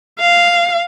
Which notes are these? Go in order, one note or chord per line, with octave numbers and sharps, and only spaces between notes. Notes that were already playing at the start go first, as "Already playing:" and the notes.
F5